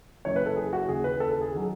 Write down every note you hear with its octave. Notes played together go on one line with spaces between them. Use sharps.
F#1 F#2 E3 C#5
B4
A4
G#4
F#4
D#2 C#3 E3 G#4
B4
A4
A4
G#4
D#3 F#3 G#4